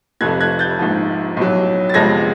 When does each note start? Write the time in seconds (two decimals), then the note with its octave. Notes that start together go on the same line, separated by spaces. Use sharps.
0.21 F1 F2 C3 F3 A3 F#6 G#6
0.41 F#6 G#6
0.59 G6 A6
0.79 A#1 G#2 F3
1.37 B1 A2 F#3
1.89 A6
1.94 G1 F2 C3 F3 G#3 G#6 A#6